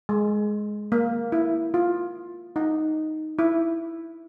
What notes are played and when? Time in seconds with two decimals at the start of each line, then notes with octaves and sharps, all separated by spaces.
0.09 G#3
0.92 A#3
1.32 E4
1.74 F4
2.56 D#4
3.39 E4